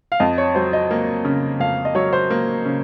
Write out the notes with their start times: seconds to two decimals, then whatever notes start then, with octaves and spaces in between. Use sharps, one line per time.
0.12 F5
0.20 F2 D#5
0.38 C#5
0.55 F#3 C5
0.73 D#5
0.91 A#3
1.25 C#3
1.60 F2 F5
1.85 D#5
1.95 F#3 C#5
2.13 C5
2.30 A#3
2.65 C#3